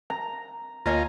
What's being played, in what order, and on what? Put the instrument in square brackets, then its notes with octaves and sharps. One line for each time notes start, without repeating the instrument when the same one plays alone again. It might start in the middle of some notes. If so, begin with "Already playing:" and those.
[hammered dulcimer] A#5
[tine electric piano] D2 A#3 F6 [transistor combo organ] F4 A#5 [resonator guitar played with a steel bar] C#5 D#5 G#5